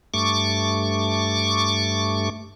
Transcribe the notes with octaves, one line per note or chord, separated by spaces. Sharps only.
G2 A3 C#6 D6